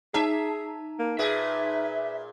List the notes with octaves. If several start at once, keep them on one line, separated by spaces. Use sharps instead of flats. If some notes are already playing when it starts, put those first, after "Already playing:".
D#4 G#4 E5 A5 A#5
A#3
A#2 G#4 B4 E5